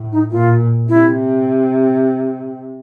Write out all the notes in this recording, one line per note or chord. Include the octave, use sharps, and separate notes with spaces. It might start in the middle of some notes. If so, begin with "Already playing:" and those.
Already playing: A2
D#4
A#2 F4
C3 E4